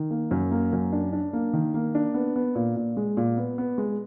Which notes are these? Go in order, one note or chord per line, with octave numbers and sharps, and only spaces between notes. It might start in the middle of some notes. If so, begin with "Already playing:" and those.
Already playing: D#3
A#3
F#2
A#3
F#2
D4
D4
A#3
D#3
A#3
D4
B3
B3
A#2
A#2
G#3
A#2
B3
B3
G#3